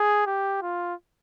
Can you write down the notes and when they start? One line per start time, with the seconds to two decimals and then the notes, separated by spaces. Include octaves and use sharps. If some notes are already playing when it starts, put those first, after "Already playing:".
Already playing: G#4
0.26 G4
0.62 F4